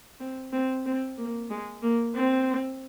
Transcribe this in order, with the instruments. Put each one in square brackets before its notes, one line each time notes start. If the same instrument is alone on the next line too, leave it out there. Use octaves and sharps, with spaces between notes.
[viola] C4
C4
C4
A#3
G#3
A#3
C4